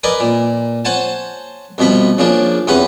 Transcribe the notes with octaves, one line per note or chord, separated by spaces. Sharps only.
A#4 B4 D5 D#5 G#5
A#2
C5 C#5 F#5 G#5 A5
C2 B2 F3 B5 C#6
C#3 F3 A#3 D4
E2 C3 C#4 B4 F#5